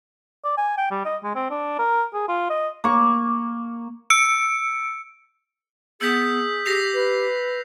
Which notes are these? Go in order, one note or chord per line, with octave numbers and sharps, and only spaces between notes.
D5
G#5
G5
G3
D#5
G#3
C4
D4
A#4
G#4
F4
D#5
A#3 C#6
E6 C#7 D7
B3 G#4 E6 G6 B6
G4 A#6 C7 F7
B4